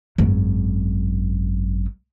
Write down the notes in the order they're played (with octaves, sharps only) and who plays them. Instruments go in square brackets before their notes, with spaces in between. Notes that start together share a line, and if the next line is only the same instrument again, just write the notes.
[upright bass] G#1 F#2